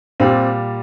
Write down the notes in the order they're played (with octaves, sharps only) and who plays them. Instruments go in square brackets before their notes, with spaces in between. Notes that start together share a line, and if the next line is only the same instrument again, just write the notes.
[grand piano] A#2 G3 C4